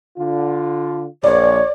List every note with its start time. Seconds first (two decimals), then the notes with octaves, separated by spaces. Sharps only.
0.17 D3 F4
1.24 A#1 C#5 D5